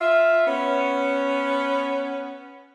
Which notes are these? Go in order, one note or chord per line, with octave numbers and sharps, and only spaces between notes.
F4 E5
B3 C#4